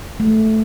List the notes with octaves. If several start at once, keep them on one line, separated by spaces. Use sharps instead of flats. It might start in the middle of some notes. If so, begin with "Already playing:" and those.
A3